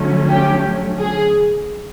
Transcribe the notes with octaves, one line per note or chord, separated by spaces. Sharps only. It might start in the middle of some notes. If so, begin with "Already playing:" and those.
Already playing: D3 F#3 A3 C#4
G4
G#4